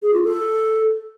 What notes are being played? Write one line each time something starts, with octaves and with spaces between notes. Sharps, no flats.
G#4
F4
A4